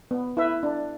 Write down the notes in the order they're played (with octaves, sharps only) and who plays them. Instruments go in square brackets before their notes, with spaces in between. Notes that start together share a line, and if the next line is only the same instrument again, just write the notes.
[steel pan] B3
E4 B4 E5
D4